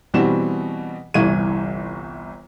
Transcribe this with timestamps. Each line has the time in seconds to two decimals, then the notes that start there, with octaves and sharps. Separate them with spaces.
0.14 B2 E3 G3 C4 F#4 E7
1.14 G1 C2 E3 C#6 G#6 D#7